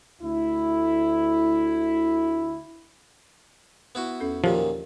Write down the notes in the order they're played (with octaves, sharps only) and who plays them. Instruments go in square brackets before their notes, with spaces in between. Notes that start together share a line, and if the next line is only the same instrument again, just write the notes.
[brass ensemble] D2 E4
[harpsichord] B3 E4 F#4
[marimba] E2 C#4 A4
[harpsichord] F#2 A#2 D#3 [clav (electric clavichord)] F3 [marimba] F4 G4 A#4